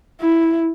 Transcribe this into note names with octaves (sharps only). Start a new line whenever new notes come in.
E4